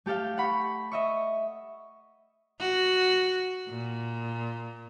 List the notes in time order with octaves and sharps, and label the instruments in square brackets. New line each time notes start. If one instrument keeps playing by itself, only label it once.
[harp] A3 G4 A4 F5 G5
F#5 B5 C#6
D#5 E5 C#6
[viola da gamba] F#4
A#2